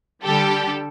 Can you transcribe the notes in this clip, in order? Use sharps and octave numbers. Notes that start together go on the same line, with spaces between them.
D3 G3 G4 A4